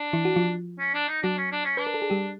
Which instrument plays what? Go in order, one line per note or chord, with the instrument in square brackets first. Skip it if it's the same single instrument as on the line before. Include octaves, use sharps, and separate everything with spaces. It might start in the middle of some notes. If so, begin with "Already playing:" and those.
Already playing: [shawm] D4
[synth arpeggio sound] E3 E4
F#4
F3 F4
[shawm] C#4
D4
D#4
[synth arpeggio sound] F#3 F#4 [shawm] D4
[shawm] C#4
D4
C#4
[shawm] D4 [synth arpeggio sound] B4
[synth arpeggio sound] A#4
A4
G#4
G3 G4